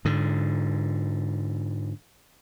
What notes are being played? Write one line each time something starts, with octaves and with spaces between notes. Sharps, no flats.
G#2 D3